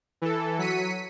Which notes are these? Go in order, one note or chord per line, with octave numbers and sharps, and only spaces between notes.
E3 A4
F#3 B6 C#7 D#7